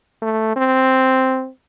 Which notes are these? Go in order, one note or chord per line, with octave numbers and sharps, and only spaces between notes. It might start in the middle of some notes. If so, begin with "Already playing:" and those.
A3
C4